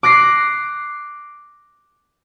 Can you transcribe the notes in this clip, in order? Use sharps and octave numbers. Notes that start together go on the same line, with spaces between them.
D6 F#6 A#6 C7